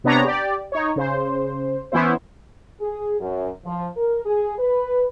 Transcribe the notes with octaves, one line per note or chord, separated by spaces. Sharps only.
C3 B3 D4 C#5 A#5
G4 D5
D#4 C#5
C#3 C5
E3 B3 C#4 E4 C5
G#4
F#2
F3
A#4
G#4
B4